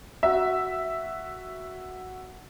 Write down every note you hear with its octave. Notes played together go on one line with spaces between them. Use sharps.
F#4 E5